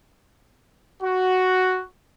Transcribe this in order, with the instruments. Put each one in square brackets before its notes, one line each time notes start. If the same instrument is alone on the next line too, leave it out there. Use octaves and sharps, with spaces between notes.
[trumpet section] F#4